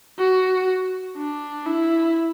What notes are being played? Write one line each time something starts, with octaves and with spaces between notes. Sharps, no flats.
F#4
D4
E4